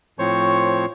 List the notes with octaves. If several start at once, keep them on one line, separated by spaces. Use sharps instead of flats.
A2 F3 C4 C5 C#5 C#6